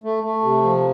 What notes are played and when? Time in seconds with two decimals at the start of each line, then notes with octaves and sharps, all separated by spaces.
0.04 A3
0.23 A3
0.43 C3
0.63 F3